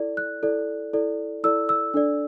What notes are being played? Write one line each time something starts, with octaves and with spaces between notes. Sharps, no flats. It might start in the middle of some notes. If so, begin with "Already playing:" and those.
Already playing: E4 A4 D5
F#6
E4 A4 D5
E4 A4 D5
E4 A4 D5 E6
E6
D4 A4 D5